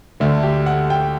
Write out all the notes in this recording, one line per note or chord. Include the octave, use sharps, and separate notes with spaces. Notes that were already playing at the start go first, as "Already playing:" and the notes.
D2 D3 A3
G4
F#5
G5